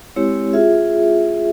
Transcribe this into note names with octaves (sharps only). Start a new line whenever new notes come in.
G#3 C4 E4 G4 C#5
F4 G#4 E5